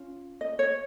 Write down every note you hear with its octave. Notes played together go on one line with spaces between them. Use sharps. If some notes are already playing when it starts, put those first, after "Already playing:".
Already playing: C#4 F4
D#5
C#5